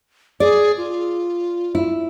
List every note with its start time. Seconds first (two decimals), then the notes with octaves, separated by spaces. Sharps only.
0.40 G#4 D5
0.77 F4
1.75 E4